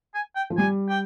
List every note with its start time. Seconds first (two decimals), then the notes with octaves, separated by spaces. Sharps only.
0.14 G#5
0.36 G5
0.50 F3
0.58 G3 G#5
0.89 G5